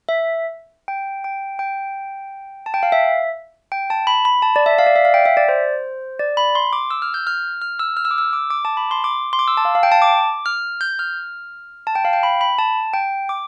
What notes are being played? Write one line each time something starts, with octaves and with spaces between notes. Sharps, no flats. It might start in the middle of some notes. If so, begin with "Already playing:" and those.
E5
G5
G5
G5
A5
G5
F5
E5
G5
A5
B5
B5
A5
D5
E5
F5
D5
E5
F5
G5
E5
D5
C5
D5
B5
C6
D6
E6
F6
G6
F6
F6
E6
F6
E6
D6
E6
D6
D6
A5
B5
C6
D6
C6
D6
E6
A5
F5
F5
G5
A5
D6
F6
G6
F6
A5
G5
F5
G5
B5
B5
A5
G5
D6